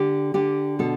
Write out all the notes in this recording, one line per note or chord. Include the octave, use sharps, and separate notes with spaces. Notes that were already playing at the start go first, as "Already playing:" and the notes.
Already playing: D3 G4
D3 G4
B2 A4